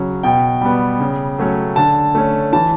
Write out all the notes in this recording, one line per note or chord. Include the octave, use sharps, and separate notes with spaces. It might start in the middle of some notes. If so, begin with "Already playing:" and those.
Already playing: C#3 F#3 C#4
B2 G5
G3 B3
C#3
F#3 A3 C#4
D3 A5
A3 C#4
E3 A5